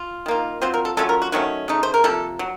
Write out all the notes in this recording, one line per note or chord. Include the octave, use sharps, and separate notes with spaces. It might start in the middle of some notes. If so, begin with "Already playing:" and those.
Already playing: F4
D#3 A#3 F4
F#3 C4 F4 C5
A#4
A4
F#3 A3 C#4 F4 A4
A#4
F#4
D#3 F#3 A3 C#4 F#4
C#3 A3 D#4
C5
A#4
C3 F3 A#3 A4
F#3